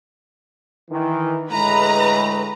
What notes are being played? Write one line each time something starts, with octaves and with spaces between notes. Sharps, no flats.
D#3 E3
A2 D3 G#3 B4 A#5